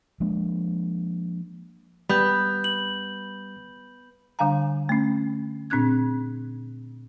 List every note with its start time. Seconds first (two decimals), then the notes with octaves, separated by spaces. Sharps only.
0.20 F3 G#3 A#3 D4
2.10 G3 B3 B5 G6
2.64 F#7
4.39 D3 G3 D4 F5 G#5 A#5
4.89 A3 C#4
5.70 A#2 C4 D4 F#6 G#6